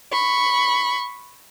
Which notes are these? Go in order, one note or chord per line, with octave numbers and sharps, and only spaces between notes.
B5 C#6